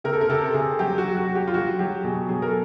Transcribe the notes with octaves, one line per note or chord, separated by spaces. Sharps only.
C3 A#4
A4
A#4
C3 A4
C3 G#4
F#3 G4
F#4
F#3
F#4
F#3
G4
F4
F#3 F#4
F#3 G4
B2 G#4
F#3 G#4
A#4
A4